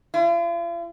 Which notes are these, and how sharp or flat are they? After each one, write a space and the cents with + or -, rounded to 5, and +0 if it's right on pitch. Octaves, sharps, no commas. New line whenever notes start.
F4 -45